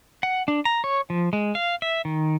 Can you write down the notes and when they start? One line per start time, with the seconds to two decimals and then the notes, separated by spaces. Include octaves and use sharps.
0.23 F#5
0.48 D4
0.65 A#5
0.84 C#5
1.10 F3
1.33 G#3
1.55 F5
1.82 E5
2.05 D#3